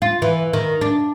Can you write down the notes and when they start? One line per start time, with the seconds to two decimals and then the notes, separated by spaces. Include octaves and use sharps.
0.02 F4
0.22 E3
0.53 D#3
0.81 D4